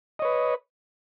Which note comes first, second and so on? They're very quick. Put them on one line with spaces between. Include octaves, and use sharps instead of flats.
D#5 C#5 B4